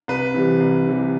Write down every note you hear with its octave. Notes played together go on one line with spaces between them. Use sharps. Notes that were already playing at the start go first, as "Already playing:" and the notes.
C2 B4
C3 E3 G3
C2
C3 E3 G3